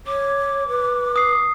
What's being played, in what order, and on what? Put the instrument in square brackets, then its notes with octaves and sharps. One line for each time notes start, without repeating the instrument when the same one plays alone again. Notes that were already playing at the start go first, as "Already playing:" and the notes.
[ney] C#5 [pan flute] D6
[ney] B4
[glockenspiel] D#6 C7